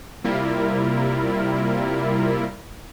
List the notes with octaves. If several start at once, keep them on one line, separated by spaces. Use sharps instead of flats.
C3 G3 A#3 E4 F4 A#4